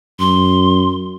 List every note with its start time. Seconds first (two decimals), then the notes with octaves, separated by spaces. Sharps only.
0.19 F#2 C6